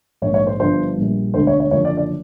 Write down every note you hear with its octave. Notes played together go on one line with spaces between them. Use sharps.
A#1 G#2 D#3 C#5
C#5
C5
G1 G2 D3 F3 C5
A#1 A#2 G3
E1 D2 D3 C5
C#5
C#5
F#1 F#2 D3 F3 C#5
D5
D5